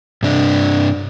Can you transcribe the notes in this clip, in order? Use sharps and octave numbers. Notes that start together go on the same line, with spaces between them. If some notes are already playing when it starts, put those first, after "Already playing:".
G2 C3 D4